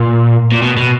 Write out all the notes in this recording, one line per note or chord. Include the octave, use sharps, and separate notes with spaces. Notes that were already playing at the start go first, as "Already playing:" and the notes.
Already playing: A#2
A#2
B2
B2